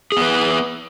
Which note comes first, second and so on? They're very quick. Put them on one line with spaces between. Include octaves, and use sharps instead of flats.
G#4 B3 B4